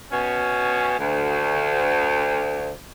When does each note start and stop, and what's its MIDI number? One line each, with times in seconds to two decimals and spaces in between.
0.11 0.92 47
0.11 0.92 61
0.99 2.74 38